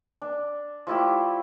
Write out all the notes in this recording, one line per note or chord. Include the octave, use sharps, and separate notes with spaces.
D4
F3 A3 E4 G4